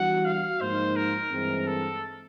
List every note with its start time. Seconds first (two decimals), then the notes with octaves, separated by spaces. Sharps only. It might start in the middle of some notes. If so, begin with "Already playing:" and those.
Already playing: E3 G3 B3 D4 F#4 F#5
0.25 F5
0.60 G#2 F3 A#3 D#4 C5
0.96 A#4
1.31 G2 E3 G#3 C4
1.67 A4